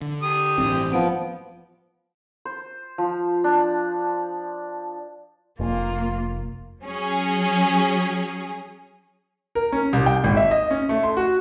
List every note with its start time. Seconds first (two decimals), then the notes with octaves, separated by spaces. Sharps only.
0.02 D3
0.23 G4 D#6
0.58 A1 G2 E3 C4
0.93 F3 B3 D7
2.45 C5
2.98 F3
3.44 D4
5.60 F1 A#3 F4
6.82 F#3 C#4 G#4
9.55 A#4
9.72 C#4
9.93 C2
10.06 G5
10.24 G#1
10.37 E5
10.51 D#5
10.71 C#4
10.89 A3
11.03 C6
11.17 F#4